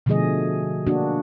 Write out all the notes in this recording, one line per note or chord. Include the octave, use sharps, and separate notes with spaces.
B2 D3 F3 A3 G#4 D#5
A#3 D4 F#4